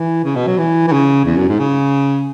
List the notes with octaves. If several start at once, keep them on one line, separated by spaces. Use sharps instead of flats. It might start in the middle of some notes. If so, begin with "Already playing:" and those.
Already playing: E3
C#3
B2
F#3
E3
E3
C#3
E2
F#2
G#2
C#3